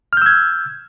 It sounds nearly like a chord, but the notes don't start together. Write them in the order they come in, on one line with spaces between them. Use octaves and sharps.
F6 G6 E6 G#6